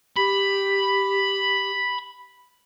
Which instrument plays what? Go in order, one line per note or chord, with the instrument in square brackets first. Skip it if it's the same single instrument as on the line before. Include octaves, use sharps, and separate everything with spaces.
[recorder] G4 [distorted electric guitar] B5 [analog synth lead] B6